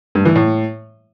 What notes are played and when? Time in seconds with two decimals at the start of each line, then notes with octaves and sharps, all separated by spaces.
0.15 G2
0.25 E3
0.36 A2